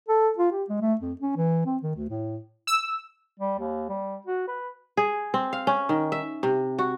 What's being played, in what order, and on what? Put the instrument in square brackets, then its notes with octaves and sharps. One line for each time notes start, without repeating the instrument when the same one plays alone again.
[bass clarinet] A4
F4
G4
G#3
A3
F2
C#4
E3
C4
D#3
D2
A2
[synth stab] E6
[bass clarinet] G3
D#2
G3
F#4
B4
[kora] G#4
C4
F5
C#4
D#3
E5
C3
F#4